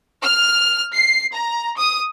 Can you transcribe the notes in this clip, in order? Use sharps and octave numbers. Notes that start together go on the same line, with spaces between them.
F6
C7
A#5
D#6